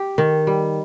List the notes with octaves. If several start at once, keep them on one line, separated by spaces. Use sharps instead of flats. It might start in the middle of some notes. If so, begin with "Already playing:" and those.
Already playing: G4
D#3
G3